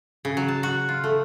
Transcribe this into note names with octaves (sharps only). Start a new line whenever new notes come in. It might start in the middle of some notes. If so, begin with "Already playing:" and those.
C#3
F#3
A5
F#4
F4
A3